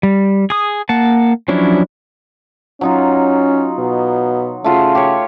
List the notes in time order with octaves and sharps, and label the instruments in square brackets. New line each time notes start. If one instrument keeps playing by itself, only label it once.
[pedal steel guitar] G3
G#4 D#6
A#3 F#5 A5
F3 F#3 C#4 D4 E4
[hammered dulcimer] F#3 D#4 F4 [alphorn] C#4
[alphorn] B2
[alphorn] C#3 [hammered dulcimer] A3 F4 F#4
[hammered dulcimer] G4 C#5